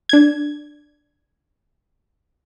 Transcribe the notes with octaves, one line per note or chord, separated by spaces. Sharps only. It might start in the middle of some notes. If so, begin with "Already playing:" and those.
D4 G#6